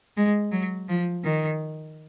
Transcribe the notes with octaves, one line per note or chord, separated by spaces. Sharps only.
G#3
F#3
F3
D#3